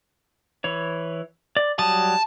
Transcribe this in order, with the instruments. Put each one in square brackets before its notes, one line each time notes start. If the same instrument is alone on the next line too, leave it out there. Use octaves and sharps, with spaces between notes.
[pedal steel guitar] E3 C#5
D5
[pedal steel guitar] F#3 G3 D#6 [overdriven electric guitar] A5